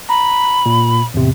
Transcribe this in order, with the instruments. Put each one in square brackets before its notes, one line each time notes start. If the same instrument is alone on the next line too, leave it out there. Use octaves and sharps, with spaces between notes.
[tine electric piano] A#5 [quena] B5
[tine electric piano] A#2
E2 A2 C3